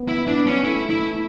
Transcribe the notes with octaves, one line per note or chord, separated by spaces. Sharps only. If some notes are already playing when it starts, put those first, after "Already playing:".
Already playing: B3
E4
D4
C#4
A3 E4
E4